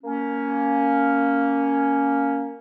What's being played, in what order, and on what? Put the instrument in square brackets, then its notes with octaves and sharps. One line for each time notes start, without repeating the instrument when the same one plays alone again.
[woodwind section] A#3 C#4